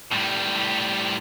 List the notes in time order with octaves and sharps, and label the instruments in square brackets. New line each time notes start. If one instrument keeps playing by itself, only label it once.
[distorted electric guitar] A2 G3